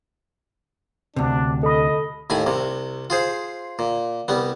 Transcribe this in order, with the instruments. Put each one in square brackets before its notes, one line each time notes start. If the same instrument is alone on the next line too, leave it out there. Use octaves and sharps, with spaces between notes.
[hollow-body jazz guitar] D2 C3 [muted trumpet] D4
[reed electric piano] A4 B5 [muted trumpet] D#5
[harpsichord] D#2 A2 G#5 B5
C2 C3
F4 G#4 C5
A#2
C2 G3 B3